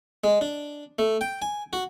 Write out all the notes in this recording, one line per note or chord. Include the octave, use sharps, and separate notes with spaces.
G#3
D4
A3
G5
G#5
F#4